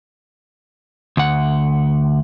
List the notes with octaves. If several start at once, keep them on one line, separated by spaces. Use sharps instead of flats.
D2 F#5